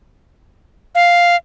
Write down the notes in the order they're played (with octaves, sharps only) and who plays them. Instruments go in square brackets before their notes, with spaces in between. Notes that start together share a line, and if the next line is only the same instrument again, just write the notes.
[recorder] F5